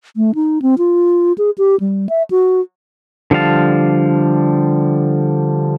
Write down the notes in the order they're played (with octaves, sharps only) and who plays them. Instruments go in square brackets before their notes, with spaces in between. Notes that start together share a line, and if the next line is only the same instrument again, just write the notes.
[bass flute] A3
D#4
C4
F4
G#4
G4
G3
E5
F#4
[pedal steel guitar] D3 F3 G3 F5 A5